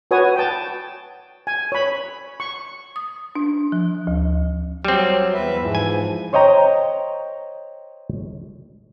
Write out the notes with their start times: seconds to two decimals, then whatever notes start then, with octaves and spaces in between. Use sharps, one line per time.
0.11 F#4 B4 C#5 G#5 D#6
0.36 G5 A5
1.47 G#5
1.72 C#5 B5
2.40 C#6
2.96 D#6
3.35 D4
3.72 F3
4.07 D2
4.85 F#3 G3 C4
5.34 E2 B4 E5
5.59 G#2 E3 F3
5.75 G#5
6.33 C5 C#5 D#5 G5 A#5